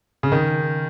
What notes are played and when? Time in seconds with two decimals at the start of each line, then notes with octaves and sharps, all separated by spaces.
0.23 C#3
0.32 D#3